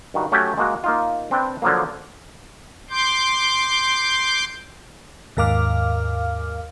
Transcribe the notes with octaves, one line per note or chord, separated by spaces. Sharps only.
G2 D#3 F#4
F#3 A3 C#4 F#4 G4
G#3 A#3 F#4
A#3 D#4 F4
C4 D4 B4 G5
D3 F3 F#3 A#3
C6 D6 G6
D#2 G#2 A#4 F5 D6 F6